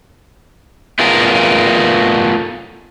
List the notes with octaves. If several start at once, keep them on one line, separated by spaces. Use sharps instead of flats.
A3 B3 F4 G#4 A#4